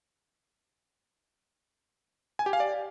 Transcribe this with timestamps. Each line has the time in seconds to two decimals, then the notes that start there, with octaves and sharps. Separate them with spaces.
2.39 G#5
2.46 G4
2.53 F5
2.60 D5